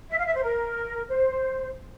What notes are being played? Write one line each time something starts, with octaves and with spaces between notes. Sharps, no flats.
E5
F5
E5
C5
A#4
C5